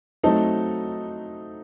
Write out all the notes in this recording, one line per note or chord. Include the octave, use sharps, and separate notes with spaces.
F#3 A3 C4 D#4 A4